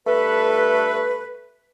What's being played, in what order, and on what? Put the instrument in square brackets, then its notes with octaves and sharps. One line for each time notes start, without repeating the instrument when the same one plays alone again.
[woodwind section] G2 A3 A4 B4